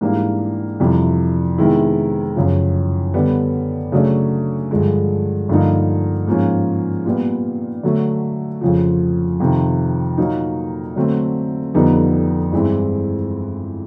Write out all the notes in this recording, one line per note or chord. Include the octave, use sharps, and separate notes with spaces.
G#2 E3 G3 A#3 D4
F2 C3 E3 G3
C3 D#3 G#3 B3 E4
F#2 C#3 F3
D3 G3 B3
C#3 F#3 A3 D4
G2 D3 F3 G#3
G2 D3 F3 A#3 D#4
G#2 F3 A#3 C#4
A#2 G3 B3
D3 F#3 A3
F2 C#3 F3
F2 C3 D#3
A#2 F#3 A#3 D#4
D3 F#3 A3 C4
F2 D3 G3 B3 D#4
G2 E3 G#3 C4 E4